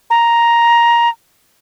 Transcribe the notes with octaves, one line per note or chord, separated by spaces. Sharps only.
A#5